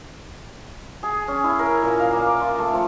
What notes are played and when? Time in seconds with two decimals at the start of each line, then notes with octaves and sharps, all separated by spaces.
1.03 G#4
1.28 C#4
1.44 E4
1.59 A#4
1.83 A#2
1.99 F5
2.13 A#3
2.26 D6
2.41 F4
2.58 A3
2.73 F3